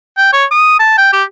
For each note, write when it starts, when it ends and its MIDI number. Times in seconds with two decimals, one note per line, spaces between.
0.18 0.28 79
0.33 0.45 73
0.51 0.78 87
0.80 0.93 81
0.98 1.09 79
1.13 1.23 67